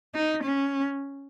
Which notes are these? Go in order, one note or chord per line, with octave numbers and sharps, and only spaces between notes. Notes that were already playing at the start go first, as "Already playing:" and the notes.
D#4
C#4